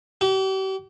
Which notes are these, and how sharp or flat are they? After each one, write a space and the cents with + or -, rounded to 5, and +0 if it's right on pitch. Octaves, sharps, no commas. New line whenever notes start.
G4 -40